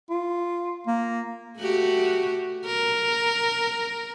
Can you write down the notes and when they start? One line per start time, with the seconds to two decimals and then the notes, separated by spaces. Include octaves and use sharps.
0.10 F4
0.87 A#3
1.59 A3 F#4 G4
2.66 A#4